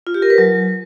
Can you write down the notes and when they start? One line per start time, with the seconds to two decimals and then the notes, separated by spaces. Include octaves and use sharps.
0.07 F4
0.14 G4
0.22 A#4
0.30 B4
0.38 F#3